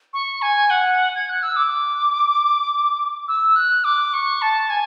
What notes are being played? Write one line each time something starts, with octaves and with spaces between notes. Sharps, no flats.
C#6
G#5
F#5
G#6
F#6
E6
D6
E6
F#6
D6
C#6
A5
G#5